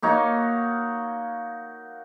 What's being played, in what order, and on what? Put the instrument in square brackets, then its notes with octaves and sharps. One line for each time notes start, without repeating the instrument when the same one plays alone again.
[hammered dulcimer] A#3 D#4 F#4 C#5